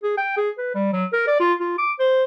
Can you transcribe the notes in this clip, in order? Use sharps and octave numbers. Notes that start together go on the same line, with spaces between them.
G#4
G5
G#4
B4
G3
F#3
A#4
D5
F4
F4
D6
C5